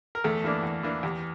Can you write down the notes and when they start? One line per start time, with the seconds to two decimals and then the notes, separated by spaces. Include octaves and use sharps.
0.15 A#4
0.24 E2 A3 A4
0.44 E3 A#3 D4
0.63 E2
0.83 E3 A#3 D4
1.03 E2 G4